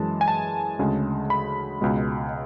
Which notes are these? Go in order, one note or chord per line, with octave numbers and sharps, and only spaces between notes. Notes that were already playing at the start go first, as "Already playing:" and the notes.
Already playing: F#2 E3 G#3 A5
G#5
A5
D2 C#3 G#3
B5
C#2 B2 G#3